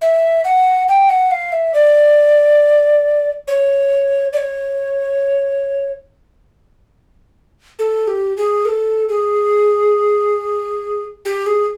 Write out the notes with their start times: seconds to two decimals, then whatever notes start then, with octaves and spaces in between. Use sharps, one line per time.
0.01 E5
0.44 F#5
0.88 G5
1.09 F#5
1.31 F5
1.52 E5
1.74 D5
3.48 C#5
4.33 D5
4.37 C#5
7.79 A4
8.07 G4
8.37 G#4
8.65 A#4
8.68 A4
9.09 G#4
11.25 G4
11.46 G#4